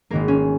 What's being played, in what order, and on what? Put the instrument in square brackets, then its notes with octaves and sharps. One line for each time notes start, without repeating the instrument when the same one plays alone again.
[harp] G#1 G#2 D#3 A#3 A#4
C#4